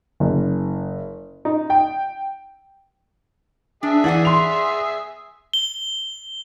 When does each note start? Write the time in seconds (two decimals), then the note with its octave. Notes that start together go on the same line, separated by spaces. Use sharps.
0.20 F#1
1.45 D#4
1.70 G5
3.83 D4 G#4 E5
4.04 E3 D5 F#5 G#5
4.25 C6 F7
5.53 G7